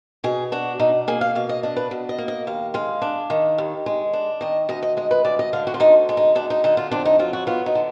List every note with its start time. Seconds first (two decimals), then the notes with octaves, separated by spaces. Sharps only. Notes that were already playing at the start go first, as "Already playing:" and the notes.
0.24 B2 G#4
0.52 D4 F#4
0.79 B2 D#4
1.08 A#3 G#4
1.21 F5
1.35 B2 F5
1.49 D#5
1.63 D4 D#5
1.76 B4
1.91 B2
2.09 D#5
2.18 A#3
2.28 D#5
2.47 D#2 F5
2.74 G#3 F5
3.02 D4
3.30 D#3
3.58 D#2
3.86 G#3
4.13 D4
4.41 D#3 D#5
4.69 D2 D#5
4.83 D#5
4.97 G#3 D#5
5.11 B4
5.25 D2 D5
5.39 D#5
5.53 D3 F5
5.67 F#4
5.74 F4
5.80 D2 D#4
6.09 G#3
6.17 D#4
6.35 D2 D4
6.50 D#4
6.64 D3 D#4
6.77 F4
6.91 F2 D4
7.05 D#4
7.19 F#3 F4
7.33 F#4
7.47 B3 F4
7.66 D#4
7.75 D3